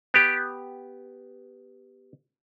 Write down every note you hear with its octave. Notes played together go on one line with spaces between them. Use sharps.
B3 G4